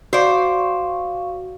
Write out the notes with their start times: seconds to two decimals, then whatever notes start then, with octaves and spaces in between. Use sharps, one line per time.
0.13 F#4 C5 D5 F5 C#6